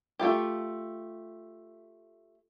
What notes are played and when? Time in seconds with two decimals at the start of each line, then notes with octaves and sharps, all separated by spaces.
0.19 A3 F4 G4